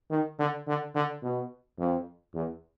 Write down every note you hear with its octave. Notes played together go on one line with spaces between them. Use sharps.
D#3
D3
D3
D3
B2
F2
E2